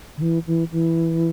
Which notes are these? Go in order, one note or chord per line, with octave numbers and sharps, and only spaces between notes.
D3
E3
E3
E3